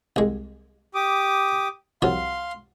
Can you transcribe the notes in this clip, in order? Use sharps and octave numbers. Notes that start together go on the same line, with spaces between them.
C2 G#3
G4 D6 D#6
C2 F3 F#3 F5 C6